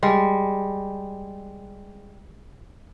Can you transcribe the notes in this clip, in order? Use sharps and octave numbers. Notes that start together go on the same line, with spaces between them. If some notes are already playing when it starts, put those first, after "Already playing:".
G3 G#3